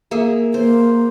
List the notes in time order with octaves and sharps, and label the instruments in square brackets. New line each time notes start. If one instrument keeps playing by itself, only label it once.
[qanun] A#3 G#4 E5
[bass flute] A#3 [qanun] C5